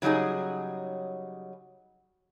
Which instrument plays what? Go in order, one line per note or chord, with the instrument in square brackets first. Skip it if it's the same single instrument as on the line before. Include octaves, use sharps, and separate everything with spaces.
[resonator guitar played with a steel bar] C#3 F#3 G3 D#4 G#4